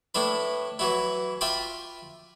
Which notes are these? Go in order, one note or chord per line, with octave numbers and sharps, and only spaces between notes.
A2 D4 E4 B4
E3 F#3 E4
F4 E5 G5 B5 D6